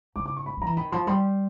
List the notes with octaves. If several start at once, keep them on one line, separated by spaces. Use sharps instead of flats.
C#3 D6
D6
C#6
B5
F3
E3 A#5
D#3 B5
F3 C6
G3 C6